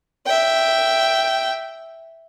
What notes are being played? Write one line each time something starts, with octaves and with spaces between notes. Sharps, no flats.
E5 G5